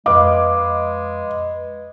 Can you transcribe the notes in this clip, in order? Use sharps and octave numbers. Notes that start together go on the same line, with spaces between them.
F2 G#3 B4 D#5 F5 D6